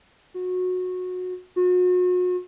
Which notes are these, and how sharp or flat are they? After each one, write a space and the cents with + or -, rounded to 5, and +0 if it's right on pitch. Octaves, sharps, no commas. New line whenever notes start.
F#4 -20
F#4 -40